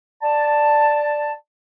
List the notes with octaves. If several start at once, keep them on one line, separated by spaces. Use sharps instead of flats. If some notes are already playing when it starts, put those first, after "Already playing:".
D5 A5